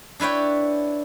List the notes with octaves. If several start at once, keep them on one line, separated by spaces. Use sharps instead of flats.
D4 E4 B4 C#5 G5